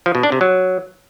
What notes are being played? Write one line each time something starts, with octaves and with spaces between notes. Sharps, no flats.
F3
B2
D4
C3
F#3